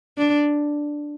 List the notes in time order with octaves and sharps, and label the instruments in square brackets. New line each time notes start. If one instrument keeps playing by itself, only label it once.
[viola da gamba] D4